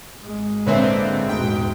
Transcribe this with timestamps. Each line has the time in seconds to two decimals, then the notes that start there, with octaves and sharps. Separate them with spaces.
0.21 G#1 G#3
0.66 A#2 D3 C4 B4 C#5 E5
1.29 E1 G#2 B3 G5